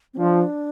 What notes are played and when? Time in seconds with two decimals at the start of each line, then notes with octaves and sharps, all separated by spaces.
0.14 C4
0.18 F3 D4